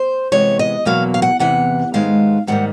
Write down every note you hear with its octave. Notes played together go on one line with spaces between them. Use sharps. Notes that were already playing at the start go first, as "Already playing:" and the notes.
Already playing: C5
C3 E3 G#3 B3 C#5
D#5
E2 B2 F#3 A#3 F5
F5
F#5
E2 C3 E3 F#5
G#2 D#3 G#3 B3 F5
G#2 D#3 G3 A#3 F#5